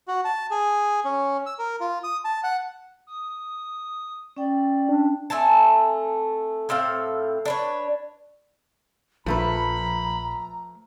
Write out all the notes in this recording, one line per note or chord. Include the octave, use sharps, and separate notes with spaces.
F#4
A5
G#4
C#4
E6
A#4
F4
D#6
A5
F#5
D#6
C#4 D5 G5
D4
A3 C4 G#5 A5
A2 C4 A4 F5
D4 B4 C#5
A#1 F3 A3 B4 A#5 B5